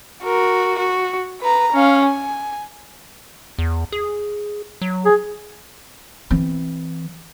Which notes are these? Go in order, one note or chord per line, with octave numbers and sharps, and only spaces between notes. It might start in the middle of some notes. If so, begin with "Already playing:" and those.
F#4 A#4
F#4
B4 A#5
C#4 F5
G#5
E2
G#4
F#3
G#4
E3 C4